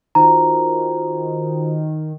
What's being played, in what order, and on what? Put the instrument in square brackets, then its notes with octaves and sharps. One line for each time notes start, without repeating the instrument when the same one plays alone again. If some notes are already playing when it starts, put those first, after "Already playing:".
[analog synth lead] D#3 [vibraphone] F4 F#4 C5 [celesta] A#5